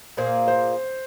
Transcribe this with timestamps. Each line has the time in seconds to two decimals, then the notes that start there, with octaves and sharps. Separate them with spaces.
0.17 A#2 A#3 F4 G#4 C5
0.48 C5